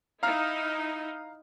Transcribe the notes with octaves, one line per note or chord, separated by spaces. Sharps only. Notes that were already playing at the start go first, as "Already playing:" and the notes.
D#4 E4 F5 A#5 F6